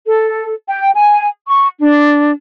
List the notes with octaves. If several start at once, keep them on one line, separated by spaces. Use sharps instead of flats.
A4
G5
G#5
C#6
D4